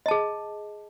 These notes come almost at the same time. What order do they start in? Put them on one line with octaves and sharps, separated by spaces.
D#5 A5 G#4